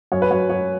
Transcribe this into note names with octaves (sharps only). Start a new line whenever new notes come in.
F#2 C#5
B4
F#2 C#5
F#2 C#5